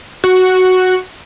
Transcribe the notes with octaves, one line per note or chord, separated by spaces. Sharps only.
F#4